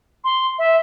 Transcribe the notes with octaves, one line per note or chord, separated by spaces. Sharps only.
C6
E5